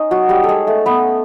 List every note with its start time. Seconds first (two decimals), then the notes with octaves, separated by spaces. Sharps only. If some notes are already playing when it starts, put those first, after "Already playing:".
Already playing: C#4 D#4
0.11 F#3 F#4
0.29 G3 G4
0.44 A4
0.49 G#3 G#4
0.67 A3 A4
0.86 B3 B4